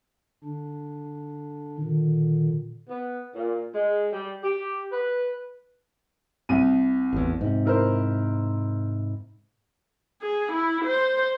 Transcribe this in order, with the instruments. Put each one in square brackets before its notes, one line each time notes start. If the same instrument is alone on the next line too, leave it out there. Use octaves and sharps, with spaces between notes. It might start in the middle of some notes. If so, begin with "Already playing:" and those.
[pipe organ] D3 D4
A#2 D3 D#3
[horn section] B3
A#2
G#3
G3
G4
B4
[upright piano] C2 D#7
[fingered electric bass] A1 E2
G#2 C3
[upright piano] E4 A#4 C5
[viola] G#4
E4
C5